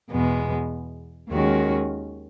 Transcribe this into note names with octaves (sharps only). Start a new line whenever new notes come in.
E2 B2 G#3 B3
D#2 D#3 G#3 C#4 F#4